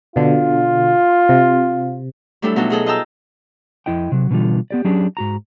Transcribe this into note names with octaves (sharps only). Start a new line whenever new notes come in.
B2 D3 F4
C3
F#3 G3 A3 D4 E4 A4
B2 F#3 D#4 F4 F#4 A4
F#3 G#4 A4 D#5
F4 D#5 G5 A5 A#5 E6
F2 E4 D#5 G5
C3 F#3
B2 D3 E3 G3 F4
B3 G4 D5
F#3 C#4 D4 G4 G#4
G#2 F#4 A#5